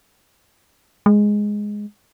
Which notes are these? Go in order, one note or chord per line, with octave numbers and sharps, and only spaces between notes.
G#3